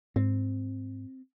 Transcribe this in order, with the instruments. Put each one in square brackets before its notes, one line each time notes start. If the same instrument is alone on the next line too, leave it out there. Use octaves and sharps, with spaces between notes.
[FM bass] G#2 [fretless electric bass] C4